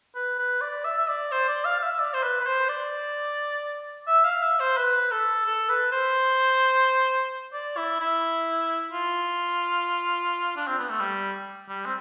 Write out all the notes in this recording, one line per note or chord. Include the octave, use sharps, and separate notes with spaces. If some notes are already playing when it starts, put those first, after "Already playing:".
B4
B4
D5
E5
E5
D5
C5
D5
F5
F5
E5
D5
C5
B4
B4
C5
D5
E5
F5
E5
C5
B4
A4
A4
B4
C5
D5
E4
E4
F4
D4
C4
B3
A3
G3
G3
C4